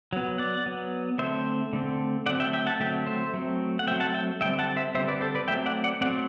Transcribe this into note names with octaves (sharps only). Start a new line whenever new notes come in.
F#3 B3
D5 F#5
F#3 B3
D3 A3 C4 C5 E5
D3 A3 C4
D3 F#3 A3 C4 D5 F#5
E5 G5
E5 G5
F#5 A5
D3 F#3 A3 C4 E5 G5
C5 E5
F#3 A3 C4
F#5
F#3 A3 C4 E5 G5
F#5 A5
E5 G5
D3 G3 C4 E5 G5
F#5 A5
C5 E5
D3 G3 C4 C5 E5
B4 D5
A4 C5
B4 D5
F#3 A3 C4 E5 G5
D5 F#5
D5 F#5
F#3 A3 C4 D5 F#5